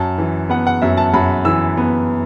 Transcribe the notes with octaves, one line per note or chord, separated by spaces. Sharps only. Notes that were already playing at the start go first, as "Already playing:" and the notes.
Already playing: F#2 A5
E3
B3 F#5
F#5
F#2 E5
A5
F#2 B5
E3 E6
B3